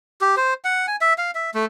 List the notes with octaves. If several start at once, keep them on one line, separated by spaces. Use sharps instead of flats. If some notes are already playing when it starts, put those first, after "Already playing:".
G4
C5
F#5
G#5
E5
F5
E5
A3